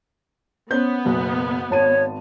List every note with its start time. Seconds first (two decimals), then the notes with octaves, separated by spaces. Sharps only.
0.70 B3 C#4 C5 G6
1.05 F#1 B1
1.70 G#1 C#5 A5 D#7